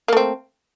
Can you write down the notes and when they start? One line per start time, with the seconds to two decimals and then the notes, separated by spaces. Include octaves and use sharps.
0.08 A#3
0.13 A3
0.17 C4